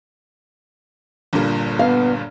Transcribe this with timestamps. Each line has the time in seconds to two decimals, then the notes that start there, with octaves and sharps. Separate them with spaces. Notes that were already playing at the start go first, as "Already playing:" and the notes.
1.33 G1 G2 A#2
1.79 B3 F5